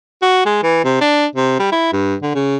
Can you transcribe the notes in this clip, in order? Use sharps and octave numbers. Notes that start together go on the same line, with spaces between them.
F#4
G#3
E3
C3
D4
C3
G3
E4
G2
D3
C#3